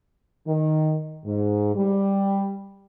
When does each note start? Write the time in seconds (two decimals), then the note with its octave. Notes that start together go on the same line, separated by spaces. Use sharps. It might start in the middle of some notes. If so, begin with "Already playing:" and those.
0.48 D#3
1.25 G#2
1.75 G3